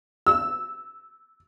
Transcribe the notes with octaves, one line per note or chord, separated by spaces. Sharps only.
E6